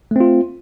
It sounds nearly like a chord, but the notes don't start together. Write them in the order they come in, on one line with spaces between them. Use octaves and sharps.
A3 C4 F4